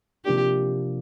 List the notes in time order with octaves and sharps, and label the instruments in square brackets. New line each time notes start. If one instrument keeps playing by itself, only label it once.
[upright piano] C3 F3 A#3 D4 [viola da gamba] G4